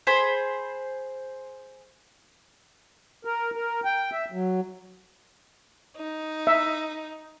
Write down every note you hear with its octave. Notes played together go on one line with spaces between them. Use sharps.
G#4 C5 B5
A#4
A#4
G5
E5
F#3
D#4
E5